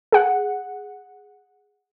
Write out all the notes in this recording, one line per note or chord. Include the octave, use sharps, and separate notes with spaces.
G#4 F#5